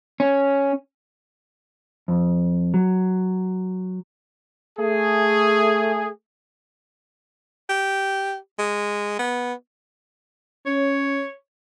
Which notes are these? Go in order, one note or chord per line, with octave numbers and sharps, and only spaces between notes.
C#4
F2
F#3
A3 G#4
G4
G#3
B3
C#4 C#5